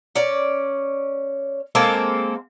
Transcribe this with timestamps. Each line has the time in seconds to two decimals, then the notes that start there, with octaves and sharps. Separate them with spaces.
0.15 C#4 D5
1.75 G#3 A#3 C4 A4